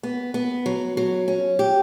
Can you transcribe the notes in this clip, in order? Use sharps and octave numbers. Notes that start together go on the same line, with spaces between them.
B3
B3
F#3
F#3
C#4
G4